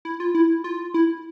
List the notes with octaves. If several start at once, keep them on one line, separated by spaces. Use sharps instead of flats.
E4
F4
E4
F4
E4